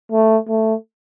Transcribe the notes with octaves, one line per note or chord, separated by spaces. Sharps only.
A3
A3